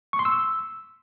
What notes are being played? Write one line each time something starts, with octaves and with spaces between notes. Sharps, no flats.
C#6
C6
E6